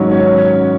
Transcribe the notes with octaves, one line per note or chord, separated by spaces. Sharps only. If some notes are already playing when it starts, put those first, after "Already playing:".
Already playing: G#2 D#3 F#3 C#4 C#5
C#4 C#5
C#4 C#5